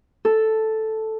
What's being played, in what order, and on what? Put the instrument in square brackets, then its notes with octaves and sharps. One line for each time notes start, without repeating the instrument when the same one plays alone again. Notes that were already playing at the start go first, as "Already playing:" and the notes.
[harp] A4